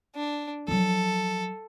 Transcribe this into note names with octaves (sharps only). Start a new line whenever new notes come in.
D4
F3 F#3 A4